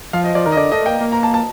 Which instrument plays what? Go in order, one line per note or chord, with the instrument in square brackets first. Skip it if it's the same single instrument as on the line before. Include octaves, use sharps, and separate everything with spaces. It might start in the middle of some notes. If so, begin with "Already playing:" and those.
[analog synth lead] F3 [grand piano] F5
[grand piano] D#5
[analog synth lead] F3 [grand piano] D5
[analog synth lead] D#3 [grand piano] A#4
[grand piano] D#5
[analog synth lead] D3 [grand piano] D5
[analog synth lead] A3 [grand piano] D#5
[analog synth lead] A#3 [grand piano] G5
[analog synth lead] A#3
[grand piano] A#5
A5
A5